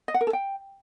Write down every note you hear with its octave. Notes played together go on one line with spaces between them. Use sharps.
D#5
F#5
A#4
A4
G5